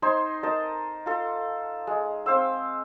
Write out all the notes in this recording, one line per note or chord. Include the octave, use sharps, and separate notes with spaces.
D#4 C5 G#5 C6
A#4 D#5 A5
F4 A4
G#3
C4 C5 F5 E6